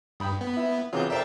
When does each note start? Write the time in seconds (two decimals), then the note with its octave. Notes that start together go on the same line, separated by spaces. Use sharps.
0.20 G2 G5 B5 D#6
0.41 B3
0.57 E4
0.93 C3 E3 F#3 F4 G#4 G6
1.10 F2 A#4 D5 E5 F5 G5 A5